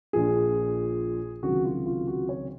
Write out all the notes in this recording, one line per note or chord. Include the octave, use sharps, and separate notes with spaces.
A#1 A#2 F3 G#4
C#2 C3 D#3 F#3 F#4
F4
F4
F#4
C#5